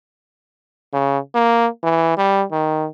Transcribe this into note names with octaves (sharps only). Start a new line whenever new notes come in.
C#3
A#3
E3
G3
D#3